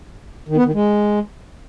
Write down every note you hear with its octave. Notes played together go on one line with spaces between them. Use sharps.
D#3
B3
D#3
G#3